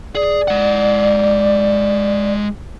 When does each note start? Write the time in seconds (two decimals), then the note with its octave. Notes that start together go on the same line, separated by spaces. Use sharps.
0.15 G#4 D5
0.48 G#3 F#5